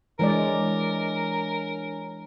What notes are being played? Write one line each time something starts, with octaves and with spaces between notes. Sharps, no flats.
E3 G#3 D4 A#4 C#5 D5 G#5